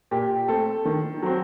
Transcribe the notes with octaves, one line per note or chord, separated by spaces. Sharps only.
A#2 G4
A3 C4 A4
D#3
F#3 C4